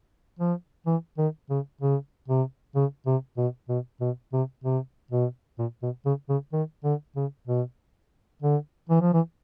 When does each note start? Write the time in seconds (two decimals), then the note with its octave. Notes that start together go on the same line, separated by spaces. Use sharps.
0.39 F3
0.86 E3
1.18 D#3
1.50 C#3
1.81 C#3
2.28 C3
2.76 C#3
3.07 C3
3.38 B2
3.69 B2
4.01 B2
4.33 C3
4.64 C3
5.11 B2
5.59 A#2
5.83 B2
6.06 C#3
6.30 C#3
6.53 D#3
6.84 D3
7.16 C#3
7.47 B2
8.42 D3
8.90 E3
9.01 F3
9.14 E3